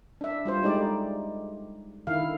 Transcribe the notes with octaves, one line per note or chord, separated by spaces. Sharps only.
D4 E5
G3 F4 C5
G#3 A3 D#4 G4 D5
D3 D#3 E4 F5